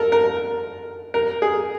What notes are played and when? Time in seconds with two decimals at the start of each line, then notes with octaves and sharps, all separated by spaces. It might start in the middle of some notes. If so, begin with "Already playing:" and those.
Already playing: A4 A#4
0.12 A#4
1.14 A#4
1.42 G#4